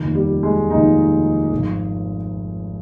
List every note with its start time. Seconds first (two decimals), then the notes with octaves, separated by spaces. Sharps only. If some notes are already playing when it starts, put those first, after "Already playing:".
Already playing: F1 D#2 D#3
0.15 G3
0.43 G#3
0.69 F1 D#2 D#3 D#4
1.51 G#1 F3